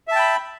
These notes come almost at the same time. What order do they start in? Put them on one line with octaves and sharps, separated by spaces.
E5 A5 G5 B5